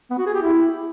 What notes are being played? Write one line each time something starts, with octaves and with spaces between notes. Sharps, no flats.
B3
F#4
G#4
G4
E4